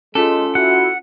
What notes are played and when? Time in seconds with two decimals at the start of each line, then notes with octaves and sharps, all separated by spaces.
0.15 G#3 C#4 F4 A4
0.55 E4 F#4 F#5